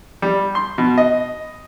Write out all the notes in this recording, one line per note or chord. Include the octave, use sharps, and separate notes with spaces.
G3
C6
B2
D#5